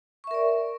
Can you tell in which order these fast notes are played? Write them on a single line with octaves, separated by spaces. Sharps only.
C#6 E5 A#4 D5